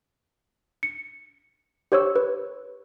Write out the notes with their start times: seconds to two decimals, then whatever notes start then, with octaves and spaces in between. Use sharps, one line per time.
0.83 C#7
1.92 G4 C5 C#5 C#6 E6
2.16 B4